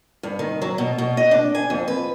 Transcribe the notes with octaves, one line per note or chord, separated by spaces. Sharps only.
G2
D#3
F#3
B2
B2
D#5
D4
G#5
F2
B4